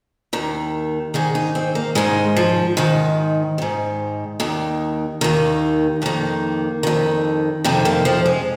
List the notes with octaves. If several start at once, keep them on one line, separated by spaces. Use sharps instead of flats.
D#2 D#3
G#2 D#3 G#4
D#4
C4
A#3
G#2 D#3 G#3
F3
G#2 D#3
G#2 D#3
D#2 D#3
D#2 D#3
F2 D#3 A#3
F2 D#3
F2 C3 D#3 C4
A#3
F3
G#3